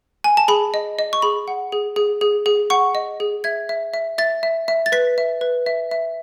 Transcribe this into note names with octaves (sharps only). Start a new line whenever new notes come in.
G#5
A5
G#4 B5
D#5
D#5
C#6
G#4 B5
F#5
G#4
G#4
G#4
G#4
F#5 C#6
D#5
G#4
E5 G#6
E5
E5
E5 A6
E5
E5
A6
B4 B6
E5
B4
E5
E5